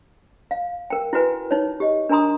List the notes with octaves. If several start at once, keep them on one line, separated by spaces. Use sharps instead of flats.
F5
A#4 G5
E4 F#4 B4 G#5
D#4 C#5
G4 D#5
D4 A#4 G#5 A#5 C6 D#6